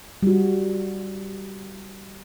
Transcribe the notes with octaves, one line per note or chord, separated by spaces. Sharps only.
G3 F#4